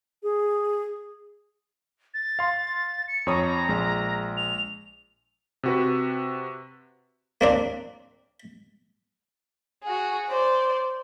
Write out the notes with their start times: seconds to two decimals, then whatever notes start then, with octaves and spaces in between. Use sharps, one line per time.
0.23 G#4
2.14 A6
2.39 F5 C6
3.08 C#7
3.27 F2 C#5 A#5 D#6
3.69 A#1 G#3
4.37 F7
5.63 C3 F#4 B4
7.41 A#3 C4 D4
9.83 F#4 G#4
10.29 C5 D5